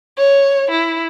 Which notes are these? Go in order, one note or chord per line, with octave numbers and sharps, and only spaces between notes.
C#5
E4